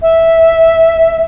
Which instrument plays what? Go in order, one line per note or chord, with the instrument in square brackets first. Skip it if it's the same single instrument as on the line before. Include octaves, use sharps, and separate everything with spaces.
[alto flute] E5